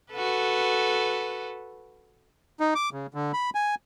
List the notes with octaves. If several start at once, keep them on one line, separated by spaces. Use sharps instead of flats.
F#4 A4 B4
D#4
D6
C#3
D3
B5
G#5